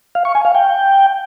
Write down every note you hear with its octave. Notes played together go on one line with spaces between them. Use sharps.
F5
C#6
G#5
F5
G5